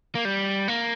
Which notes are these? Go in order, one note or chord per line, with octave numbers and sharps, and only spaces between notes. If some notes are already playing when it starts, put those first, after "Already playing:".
A#3
G3
A#3